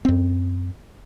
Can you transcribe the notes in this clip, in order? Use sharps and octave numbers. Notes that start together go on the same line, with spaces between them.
F#2 C4